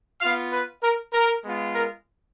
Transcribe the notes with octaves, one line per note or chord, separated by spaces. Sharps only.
B3 F4 F5
B4
A#4
A#4
G#3 B3 F4
A#4